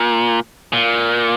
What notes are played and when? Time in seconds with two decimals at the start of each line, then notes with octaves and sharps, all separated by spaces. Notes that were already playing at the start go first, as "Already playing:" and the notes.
Already playing: A#2
0.73 A#2